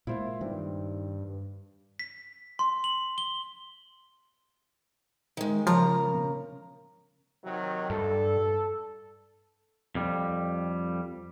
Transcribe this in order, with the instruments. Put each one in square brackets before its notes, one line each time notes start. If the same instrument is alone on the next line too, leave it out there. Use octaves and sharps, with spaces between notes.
[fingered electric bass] A#2 G#3 A#3 [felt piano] E4 F4 C5
[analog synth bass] G2 [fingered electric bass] D#3 [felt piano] C4
[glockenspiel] B6
C6
F#7
G7
[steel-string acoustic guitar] D#3 G#3
[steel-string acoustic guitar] C#3 A#4 A#5 [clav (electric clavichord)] F3
[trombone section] C3 D#3 F#3
[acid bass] G2 [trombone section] A4
[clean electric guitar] F2 G3